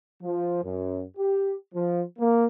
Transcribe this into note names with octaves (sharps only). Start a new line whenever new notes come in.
F3
F#2
G4
F3
A#3